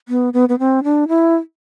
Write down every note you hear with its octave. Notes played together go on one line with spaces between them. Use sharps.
B3
B3
B3
C4
D4
E4